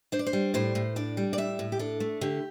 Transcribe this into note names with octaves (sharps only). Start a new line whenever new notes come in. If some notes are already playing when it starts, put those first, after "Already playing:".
D4 C5
D5
C5
G3
A2 C5
A2
D4 D5
G3
D5
A2 E5
A2
G4
D4 A4
A3
D3 G4